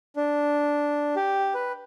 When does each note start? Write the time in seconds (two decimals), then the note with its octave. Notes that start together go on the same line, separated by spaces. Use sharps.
0.16 D4
1.16 G4
1.54 B4